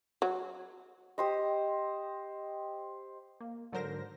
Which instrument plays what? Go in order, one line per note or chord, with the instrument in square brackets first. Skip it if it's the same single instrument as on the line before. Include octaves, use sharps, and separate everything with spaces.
[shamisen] F#3
[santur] G4 C5 D#5
[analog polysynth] A#3
G#2 D3 F#3 A#4 C5 A#6